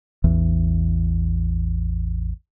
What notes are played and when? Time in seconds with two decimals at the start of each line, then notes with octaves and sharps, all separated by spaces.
0.24 A1 E2 E3